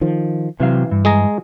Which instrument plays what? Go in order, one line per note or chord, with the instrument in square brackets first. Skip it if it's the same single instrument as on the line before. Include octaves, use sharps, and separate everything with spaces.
[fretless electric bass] D#3 F3
[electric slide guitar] C3 F#3 F5 [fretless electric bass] E3
[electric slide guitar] G2
[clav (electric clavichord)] G#3 G#4 A#5